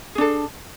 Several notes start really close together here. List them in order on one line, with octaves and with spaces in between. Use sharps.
G#4 D4 A4